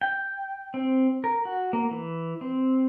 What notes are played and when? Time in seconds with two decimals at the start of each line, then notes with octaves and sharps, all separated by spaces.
0.01 G5
0.74 C4
1.24 A#4
1.45 F#4
1.73 A#3
1.91 E3
2.41 C4